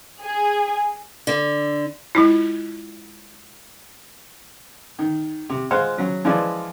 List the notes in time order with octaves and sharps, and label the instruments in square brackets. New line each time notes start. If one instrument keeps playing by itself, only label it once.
[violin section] G#4
[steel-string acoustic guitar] D3
[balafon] G#3 E4 F4
[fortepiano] D#3
C3
G#3 F4 C5 F5 F#5
C#3 F#3 F#4
E3 F3 G#3 F4 D5